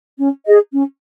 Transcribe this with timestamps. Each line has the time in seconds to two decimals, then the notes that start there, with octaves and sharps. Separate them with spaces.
0.18 C#4
0.45 G#4 D#5
0.72 C#4